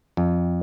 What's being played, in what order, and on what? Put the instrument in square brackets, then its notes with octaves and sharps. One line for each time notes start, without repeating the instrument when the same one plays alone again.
[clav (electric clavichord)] F2